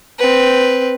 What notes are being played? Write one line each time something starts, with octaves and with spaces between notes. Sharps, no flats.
C4 B4